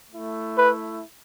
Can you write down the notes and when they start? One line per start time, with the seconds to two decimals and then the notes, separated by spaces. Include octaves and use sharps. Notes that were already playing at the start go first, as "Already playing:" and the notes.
0.11 A3 E4
0.56 B4